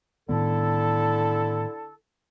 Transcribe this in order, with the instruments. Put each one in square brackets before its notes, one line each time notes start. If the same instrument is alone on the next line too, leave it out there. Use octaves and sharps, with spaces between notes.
[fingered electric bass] A2 D#3 B3 [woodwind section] D3 E4 A4